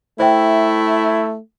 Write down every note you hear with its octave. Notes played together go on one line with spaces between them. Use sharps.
A3 E4 C5 E5 G5